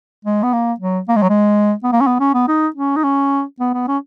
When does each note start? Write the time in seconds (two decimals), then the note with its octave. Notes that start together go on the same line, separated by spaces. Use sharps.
0.25 G#3
0.43 B3
0.53 A#3
0.80 F#3
1.08 A#3
1.16 G#3
1.22 F#3
1.29 G#3
1.84 B3
1.92 A#3
2.00 C#4
2.07 B3
2.20 C#4
2.34 B3
2.48 D#4
2.76 C#4
2.96 D#4
3.04 C#4
3.60 B3
3.74 B3
3.88 C#4